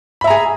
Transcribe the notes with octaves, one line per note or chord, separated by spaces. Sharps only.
G#4 E5 A#5 B5